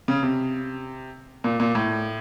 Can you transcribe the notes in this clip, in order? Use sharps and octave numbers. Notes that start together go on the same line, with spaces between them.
C#3
C3
A#2
A#2
A2